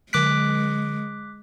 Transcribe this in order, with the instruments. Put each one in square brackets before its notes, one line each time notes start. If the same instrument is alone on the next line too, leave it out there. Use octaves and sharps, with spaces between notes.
[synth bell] D3 D7 [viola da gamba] G#3 [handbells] D6 F#6 B6